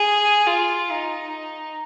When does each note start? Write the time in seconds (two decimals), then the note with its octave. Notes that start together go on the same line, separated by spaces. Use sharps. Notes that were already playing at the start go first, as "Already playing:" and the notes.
Already playing: G#4
0.47 F4
0.91 D#4